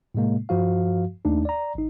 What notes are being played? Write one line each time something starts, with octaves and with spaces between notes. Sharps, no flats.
A2 C3 G#3 A#3
G2 F3 F#4 F5
D#2 A3 D4 D#4
D5 A#5
A1 D#4